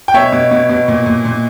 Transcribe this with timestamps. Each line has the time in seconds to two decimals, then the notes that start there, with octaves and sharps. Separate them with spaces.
0.08 G5
0.14 B2 C#5 E5
0.32 B2
0.51 B2
0.69 B2
0.88 A#2
1.06 A#2
1.25 A#2